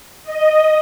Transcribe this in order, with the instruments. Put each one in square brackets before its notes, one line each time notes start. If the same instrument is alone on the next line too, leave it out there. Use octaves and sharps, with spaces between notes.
[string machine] D#5